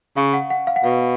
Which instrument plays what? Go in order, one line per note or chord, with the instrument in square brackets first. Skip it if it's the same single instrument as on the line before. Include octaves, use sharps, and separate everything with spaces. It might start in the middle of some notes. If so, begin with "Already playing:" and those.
[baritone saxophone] C#3 [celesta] F5
[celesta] F#5
F#5
F5
F#5
[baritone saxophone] B2 [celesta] F5